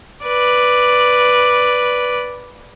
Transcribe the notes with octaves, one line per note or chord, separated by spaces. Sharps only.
B4 D5